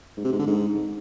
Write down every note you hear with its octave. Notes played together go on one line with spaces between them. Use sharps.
G#2
C3
G#2
D3
G#2